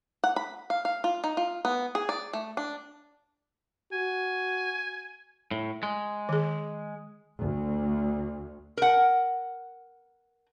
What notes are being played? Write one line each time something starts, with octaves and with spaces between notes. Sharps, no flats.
F#5
B5
F5
F5
F4
D#4
F4
B3
G#4
D5
A3
D4
F#4 G#5
A2
G#3
D#3 G#4
D2
A#4 F#5